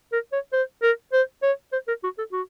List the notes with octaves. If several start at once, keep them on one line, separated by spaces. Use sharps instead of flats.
A#4
C#5
C5
A#4
C5
C#5
C5
A#4
F#4
A4
F#4